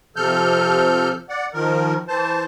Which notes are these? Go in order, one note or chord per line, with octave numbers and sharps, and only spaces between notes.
C3 F3 A4 F6 G6
D5 F#5
D#3 F3 A#4
E3 C5 A5